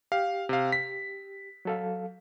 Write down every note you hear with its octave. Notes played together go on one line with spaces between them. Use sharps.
G4 F5
C3 F5
B6
F#3 A4 F5